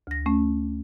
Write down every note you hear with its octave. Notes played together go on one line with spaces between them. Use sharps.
D2 A#6
A3 C#4